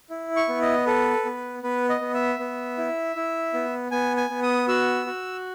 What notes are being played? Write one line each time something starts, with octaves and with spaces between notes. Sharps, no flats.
E4
C#6
B3
D#5
A4 B4
B3
B3 B4
D#5
B3
E5
B3
E4
E4
B3
B3 G#5
G#5
B3
D#6
F#4 E6
F#4